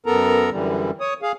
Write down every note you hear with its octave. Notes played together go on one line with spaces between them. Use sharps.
F#2 B3 A4 A#4 A#5
F#2 D3 E3 G3
C#5 D#6
G#4 F5